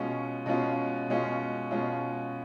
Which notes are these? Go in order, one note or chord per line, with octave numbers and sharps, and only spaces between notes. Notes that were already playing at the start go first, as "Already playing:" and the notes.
Already playing: B2 G#3 C#4 F4
B2 G#3 C#4 F4
B2 G#3 C#4 F4
B2 G#3 C#4 F4